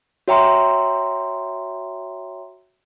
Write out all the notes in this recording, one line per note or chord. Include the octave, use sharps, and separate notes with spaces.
F#4 C#5 E5 G5 A#5 C6